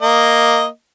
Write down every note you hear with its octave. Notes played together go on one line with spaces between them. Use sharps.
A#3 D#5